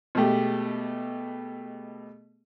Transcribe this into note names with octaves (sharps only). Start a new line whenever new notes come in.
B2 G#3 A3 G4